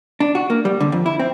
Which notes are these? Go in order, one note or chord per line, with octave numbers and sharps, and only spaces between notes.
D4
F#4
A#3
G3
D3
F2
E4
C4